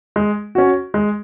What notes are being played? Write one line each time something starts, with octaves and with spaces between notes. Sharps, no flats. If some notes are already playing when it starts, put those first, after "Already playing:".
G#3
C#4 F#4
G#3